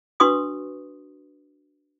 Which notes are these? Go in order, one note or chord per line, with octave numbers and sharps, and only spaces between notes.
D4 F#4 B4 C6 C#6 D#6